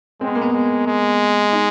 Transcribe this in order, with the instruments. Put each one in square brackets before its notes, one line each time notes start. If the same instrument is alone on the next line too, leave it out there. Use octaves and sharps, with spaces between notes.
[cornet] G#3 [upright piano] C4
[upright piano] B3
A#3
B3
[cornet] G#3
G#3
[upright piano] D#4